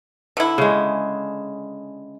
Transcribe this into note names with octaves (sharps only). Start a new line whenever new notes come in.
D3 E4
C#3 G#3